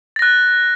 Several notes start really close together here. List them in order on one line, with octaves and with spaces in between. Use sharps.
A6 A#6 F#6